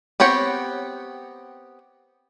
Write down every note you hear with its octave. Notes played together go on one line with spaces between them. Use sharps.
B3 C4 G4 C#5 F#5